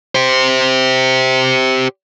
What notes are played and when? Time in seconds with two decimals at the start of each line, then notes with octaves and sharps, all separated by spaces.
0.15 G4 C5